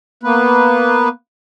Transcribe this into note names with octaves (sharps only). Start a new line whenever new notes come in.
A#3 B3 B4